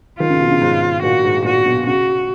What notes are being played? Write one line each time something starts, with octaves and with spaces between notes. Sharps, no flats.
D#3 F4
C#3
B2
C#3
G#2
A#2 F#4
G#2
A#2 F#4
B2
C#3 F#4